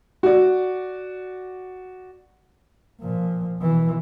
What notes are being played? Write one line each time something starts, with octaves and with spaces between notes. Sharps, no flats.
F#4 D5
A#2 F3
B2 E3